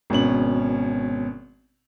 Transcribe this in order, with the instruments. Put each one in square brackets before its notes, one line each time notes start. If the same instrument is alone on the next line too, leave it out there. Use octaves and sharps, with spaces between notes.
[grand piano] G#1 B2 C#4 F#7